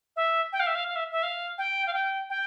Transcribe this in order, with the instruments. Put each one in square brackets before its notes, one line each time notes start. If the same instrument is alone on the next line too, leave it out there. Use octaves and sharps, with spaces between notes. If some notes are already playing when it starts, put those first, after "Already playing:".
[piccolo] E5
G5
F5
E5
F5
F5
E5
E5
F5
G5
F5
G5
G5